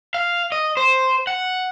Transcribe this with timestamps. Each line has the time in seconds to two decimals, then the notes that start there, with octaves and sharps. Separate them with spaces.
0.14 F5
0.52 D#5
0.77 C5
1.27 F#5